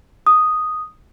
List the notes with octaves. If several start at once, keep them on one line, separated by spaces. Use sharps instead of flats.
D#6